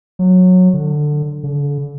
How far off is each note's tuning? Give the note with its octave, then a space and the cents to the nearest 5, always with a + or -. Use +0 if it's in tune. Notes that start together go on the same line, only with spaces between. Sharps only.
F#3 -15
D3 +15
D3 -40